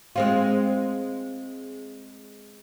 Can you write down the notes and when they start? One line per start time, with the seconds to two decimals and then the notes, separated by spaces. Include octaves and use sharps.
0.16 G#3 C4 F4